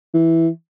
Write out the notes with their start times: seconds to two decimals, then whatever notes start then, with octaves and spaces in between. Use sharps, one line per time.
0.14 E3